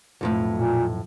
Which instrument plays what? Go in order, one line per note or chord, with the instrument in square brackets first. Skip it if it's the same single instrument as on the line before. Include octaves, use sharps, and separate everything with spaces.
[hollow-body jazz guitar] B1 F2 A2
[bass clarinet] A#2